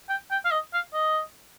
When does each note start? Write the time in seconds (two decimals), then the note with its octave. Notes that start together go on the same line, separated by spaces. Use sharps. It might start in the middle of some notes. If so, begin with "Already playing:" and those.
0.09 G5
0.31 G5
0.45 F5
0.52 D#5
0.74 F5
0.94 D#5